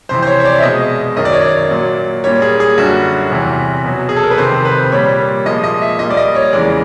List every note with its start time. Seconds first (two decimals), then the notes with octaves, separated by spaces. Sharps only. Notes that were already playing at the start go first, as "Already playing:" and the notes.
0.09 F2 C3 E3 C5
0.23 C5
0.27 C#5
0.40 C#5
0.45 D5
0.59 E5
0.63 B2 G#3 D#5
1.16 F#2 D#3 F#3 D#5
1.25 D5
1.33 C#5
1.41 D5
1.71 A#2 F#3
2.24 A#2 G3 C#5
2.42 G#4
2.60 G#4
2.78 F#2 D3 G3 F#4
3.31 E2 C3 E3
3.85 B2 F#3
4.09 G#4
4.16 A4
4.24 A#4
4.31 B4
4.38 F2 C3 D#3 C5
4.65 B4
4.79 C5
4.92 A#2 G3 C#5
5.46 A#2 F3 G#3 D#5
5.64 D#5
5.82 E5
5.99 A#2 G3 D#5
6.10 D5
6.17 D#5
6.35 C#5
6.53 E2 C#3 E3 G#3 D5